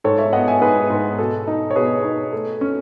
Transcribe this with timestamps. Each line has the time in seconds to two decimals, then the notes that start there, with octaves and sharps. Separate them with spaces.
0.04 G#2 A4 C#5
0.18 C#5 E5
0.33 B3 D#5 F#5
0.48 E5 G#5
0.61 G#2 G#4 B4
0.90 G#2
1.18 B2 A4
1.47 D#4
1.71 C#5
1.75 B2 G#4 B4
2.04 D#4
2.33 A3
2.61 C#4